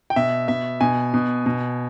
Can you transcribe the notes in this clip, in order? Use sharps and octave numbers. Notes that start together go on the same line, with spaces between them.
G5
B2 E5
B2 E5
B2 G#5
B2
B2